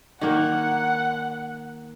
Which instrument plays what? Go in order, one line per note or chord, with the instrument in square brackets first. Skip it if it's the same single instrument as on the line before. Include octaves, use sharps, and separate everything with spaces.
[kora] D#3 A#3 [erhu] F#5